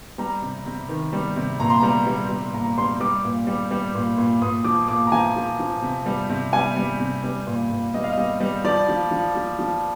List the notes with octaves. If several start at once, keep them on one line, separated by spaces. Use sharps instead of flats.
G3 A#5
C3
C3
D#3
G3
C3
A#2 A#5
C6
G3 A#5
G3
G3
A#2 A#5
G3 C6
G3 D6
A#2
G3
G3
A#2
A#2
A#2 D#6
F3 D6
A#2 D6
A#5
F3 G#5
F3
F3
C3
G3
C3
G3 G#5
G3
C3
G3
A#2
A#2
G3 D#5
F5
G3 D#5
G3
F3 D5
F3
F3
F3
F3